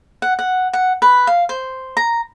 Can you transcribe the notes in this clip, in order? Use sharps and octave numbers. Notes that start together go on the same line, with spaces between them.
F#5
F#5
F#5
B4
F5
C5
A#5